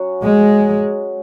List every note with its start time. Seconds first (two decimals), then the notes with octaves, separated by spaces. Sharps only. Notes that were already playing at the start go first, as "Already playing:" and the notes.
Already playing: F#3 C#4 F#4
0.23 G#3